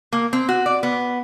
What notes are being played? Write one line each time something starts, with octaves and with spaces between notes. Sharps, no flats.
A#3
C4
F#4
D5
B3